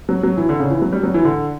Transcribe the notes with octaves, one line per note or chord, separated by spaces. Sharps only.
F#3
F#3
E3
D3
C#3
E3
F#3
G3
F#3
E3
D3